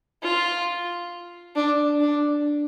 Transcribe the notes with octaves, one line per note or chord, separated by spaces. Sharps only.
F4
D4
D4